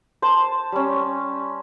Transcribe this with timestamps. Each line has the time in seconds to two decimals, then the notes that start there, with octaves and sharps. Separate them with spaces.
0.22 C5 A5
0.72 G3 C#4